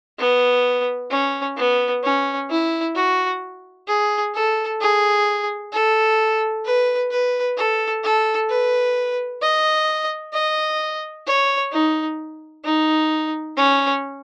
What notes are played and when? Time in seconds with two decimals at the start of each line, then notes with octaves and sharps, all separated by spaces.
0.19 B3
1.11 C#4
1.57 B3
2.03 C#4
2.50 E4
2.96 F#4
3.88 G#4
4.34 A4
4.81 G#4
5.72 A4
6.65 B4
7.11 B4
7.57 A4
8.04 A4
8.50 B4
9.42 D#5
10.33 D#5
11.27 C#5
11.72 D#4
12.64 D#4
13.57 C#4